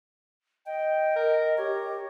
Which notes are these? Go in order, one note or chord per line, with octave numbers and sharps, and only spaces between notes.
D#5 G5
A#4
G4 C#5